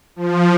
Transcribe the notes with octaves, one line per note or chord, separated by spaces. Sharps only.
F3